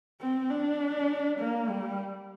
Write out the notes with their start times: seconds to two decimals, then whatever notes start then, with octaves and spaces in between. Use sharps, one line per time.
0.21 C4
0.50 D4
1.40 A#3
1.69 G3